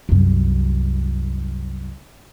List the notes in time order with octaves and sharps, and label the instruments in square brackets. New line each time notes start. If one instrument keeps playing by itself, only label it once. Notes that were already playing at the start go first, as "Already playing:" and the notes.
[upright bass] C2 F#2